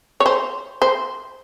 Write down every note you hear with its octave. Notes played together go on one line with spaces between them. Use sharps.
C#5
C5
C5